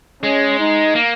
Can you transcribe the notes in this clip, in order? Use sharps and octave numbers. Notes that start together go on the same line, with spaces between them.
G#3 C#4
D#4
A#3